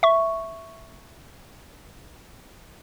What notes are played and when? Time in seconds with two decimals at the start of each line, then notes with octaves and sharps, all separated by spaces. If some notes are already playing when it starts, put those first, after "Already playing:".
0.03 E5 C#6